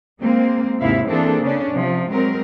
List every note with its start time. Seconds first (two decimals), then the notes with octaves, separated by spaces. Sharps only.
0.21 G#3 A#3 C4
0.79 D#2 G#2 C3 E4 E5 F5
1.09 E3 A#3 C4 D4 G#4 A4
1.43 C#3 C#4 D4
1.74 C3 F3
2.11 F#3 G#3 C4 A#4